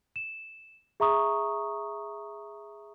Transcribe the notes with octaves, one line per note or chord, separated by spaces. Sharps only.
E7
G#4 E5 A#5 C#6 D#6